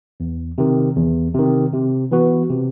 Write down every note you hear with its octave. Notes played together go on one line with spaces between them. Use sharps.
E2
C3 D#3
E2
C3 D#3
C3
E3 B3 F#4 B4
C3